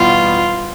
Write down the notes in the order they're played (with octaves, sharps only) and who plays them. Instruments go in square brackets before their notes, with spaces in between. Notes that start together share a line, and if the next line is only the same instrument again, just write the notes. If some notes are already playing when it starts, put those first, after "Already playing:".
Already playing: [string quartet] E2 B2 G3 B3 F4